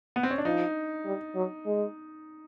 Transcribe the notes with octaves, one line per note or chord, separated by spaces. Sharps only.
B3
C4
C#4
D4
F3 D#4
G3
F#3
G#3